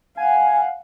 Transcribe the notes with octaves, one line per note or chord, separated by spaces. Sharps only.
F5 F#5 G#5